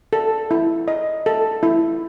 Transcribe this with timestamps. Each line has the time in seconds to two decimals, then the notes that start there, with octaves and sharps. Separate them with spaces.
0.13 A4
0.51 E4
0.88 D#5
1.26 A4
1.63 E4